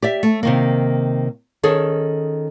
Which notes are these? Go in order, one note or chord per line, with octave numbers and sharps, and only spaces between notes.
G4 D5 E5
A3
C3 D#3 A#3
D#3 C#4 G#4 A4